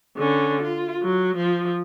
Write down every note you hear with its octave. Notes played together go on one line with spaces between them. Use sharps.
D3 C#4
F4
F#3
F3